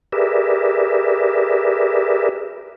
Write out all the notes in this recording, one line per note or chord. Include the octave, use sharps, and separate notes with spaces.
G4 G#4 A#4 B4 D5 E5